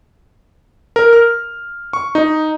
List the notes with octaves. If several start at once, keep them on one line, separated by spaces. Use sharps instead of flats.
A#4
F6
C#6
D#4